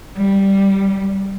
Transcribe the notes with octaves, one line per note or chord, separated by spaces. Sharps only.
G3